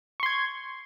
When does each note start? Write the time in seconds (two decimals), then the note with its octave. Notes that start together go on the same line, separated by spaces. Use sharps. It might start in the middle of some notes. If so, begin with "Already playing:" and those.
0.20 C#6
0.23 C6
0.26 G#6